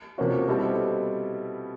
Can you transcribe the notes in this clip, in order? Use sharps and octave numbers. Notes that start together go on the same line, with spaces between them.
C3 F3 A#3 C#4 F#4
B2 G3 C4 E4 A4